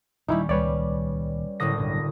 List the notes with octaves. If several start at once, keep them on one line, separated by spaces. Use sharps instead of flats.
D#1 D#2 G3 C#4 D#4 E4
C#2 G3 B4 C#5 D5
F#1 A2 D3 D#6 A#6
B1 G2